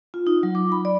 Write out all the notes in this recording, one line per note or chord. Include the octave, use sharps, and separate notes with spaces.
F4
D#4
F#3
D6
B5
D5